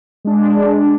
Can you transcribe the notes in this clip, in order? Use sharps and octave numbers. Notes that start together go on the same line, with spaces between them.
G#3 D4